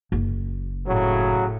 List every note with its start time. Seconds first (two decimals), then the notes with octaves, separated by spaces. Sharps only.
0.12 F#1
0.86 A2 C#3 F#3